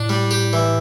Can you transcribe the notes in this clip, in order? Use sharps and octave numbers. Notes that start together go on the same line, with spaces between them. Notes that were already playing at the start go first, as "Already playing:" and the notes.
Already playing: A2 D4
G3
G4
E3